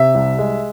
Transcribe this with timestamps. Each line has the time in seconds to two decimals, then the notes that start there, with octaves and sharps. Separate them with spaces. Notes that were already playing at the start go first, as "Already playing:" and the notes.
Already playing: C3 E5
0.15 C2
0.39 G#3